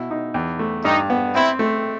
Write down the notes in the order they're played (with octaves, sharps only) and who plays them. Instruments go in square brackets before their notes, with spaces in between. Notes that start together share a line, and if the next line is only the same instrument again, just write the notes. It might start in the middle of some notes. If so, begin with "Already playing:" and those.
Already playing: [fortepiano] B2 E4
D#4
E2
A3
[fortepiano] G2 [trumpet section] D#4
[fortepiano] B3
[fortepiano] C4 [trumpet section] E4
[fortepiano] A3